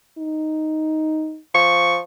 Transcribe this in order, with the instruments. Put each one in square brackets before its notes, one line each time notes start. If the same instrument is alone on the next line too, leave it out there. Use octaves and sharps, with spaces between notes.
[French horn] D#4
[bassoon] F3 [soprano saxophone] C#6